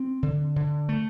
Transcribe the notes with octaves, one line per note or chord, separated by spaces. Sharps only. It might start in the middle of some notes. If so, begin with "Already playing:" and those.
Already playing: C4
D3
D3
A3